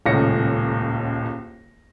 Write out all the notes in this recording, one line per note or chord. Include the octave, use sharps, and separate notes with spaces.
D#1 C#2 A2 C#4 A#6 C#7